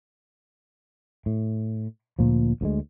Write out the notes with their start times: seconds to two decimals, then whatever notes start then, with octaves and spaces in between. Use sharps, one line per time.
1.26 A2
2.19 D2 A#2 F3
2.61 D2 F3 G#3